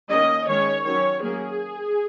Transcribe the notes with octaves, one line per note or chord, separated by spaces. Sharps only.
D#3 A#3 C#4 D#5
D#3 G#3 C#4 C#5
D#3 F#3 C#4 C#5
F#3 A#3 C#4 G#4